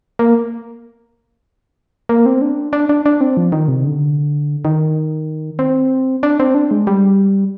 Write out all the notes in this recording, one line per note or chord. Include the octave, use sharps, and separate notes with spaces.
A#3
A#3
C4
D4
D4
D4
D4
C4
F3
D#3
C3
D3
D#3
C4
D4
C4
D4
G#3
G3